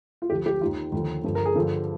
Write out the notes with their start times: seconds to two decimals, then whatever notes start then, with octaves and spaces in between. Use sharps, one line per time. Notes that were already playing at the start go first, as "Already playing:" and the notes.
0.22 F4
0.30 D2 D3 F3 G4
0.46 G4
0.61 D#3 F4
0.65 D#2
0.92 D#2 D3 F3
1.24 G2 D3 F3
1.35 A#4
1.46 G#4
1.56 G2 D3 F3